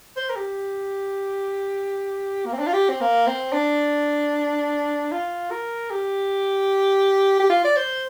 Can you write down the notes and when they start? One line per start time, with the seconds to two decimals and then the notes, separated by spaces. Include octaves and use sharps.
0.17 C5
0.29 A#4
0.36 G4
2.46 A#3
2.53 C4
2.59 D4
2.67 F4
2.73 G4
2.89 C4
3.01 A#3
3.27 C4
3.53 D4
5.12 F4
5.51 A#4
5.91 G4
7.39 G4
7.50 F4
7.64 D5
7.76 C5